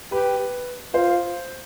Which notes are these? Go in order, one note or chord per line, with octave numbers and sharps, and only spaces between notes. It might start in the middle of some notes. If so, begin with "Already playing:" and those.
G4 B4
F4 C5